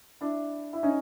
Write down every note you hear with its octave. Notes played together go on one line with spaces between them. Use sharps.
D4 E4
E4
C#4 D#4